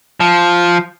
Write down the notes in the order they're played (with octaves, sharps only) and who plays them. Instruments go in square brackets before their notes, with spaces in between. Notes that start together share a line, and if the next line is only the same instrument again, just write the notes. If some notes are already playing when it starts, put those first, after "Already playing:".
[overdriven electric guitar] F3